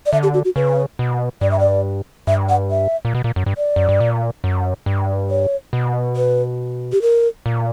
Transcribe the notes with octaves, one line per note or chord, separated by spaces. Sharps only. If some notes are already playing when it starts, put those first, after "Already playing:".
D5
D3 E5
G4
F#4
F#4
C#3 B4
B2
G2 D5
E5
D5
G2 E5
F#5
E5
A#2
B2
A#2
F#2
G2
D5
F#2
G2
A#2
F#2
G2
C#5
B2
B4
G4
A#4
A#2